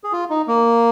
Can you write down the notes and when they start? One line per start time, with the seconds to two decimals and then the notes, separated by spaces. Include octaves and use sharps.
0.04 G#4
0.12 F4
0.30 D#4
0.47 A#3